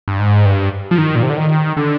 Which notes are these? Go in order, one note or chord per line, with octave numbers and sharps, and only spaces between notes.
G2
G#2
G2
F3
D#3
A#2
C3
D3
D#3
D3